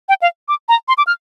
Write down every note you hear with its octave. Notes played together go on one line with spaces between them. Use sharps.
G5
F5
D6
A#5
C6
D6
F6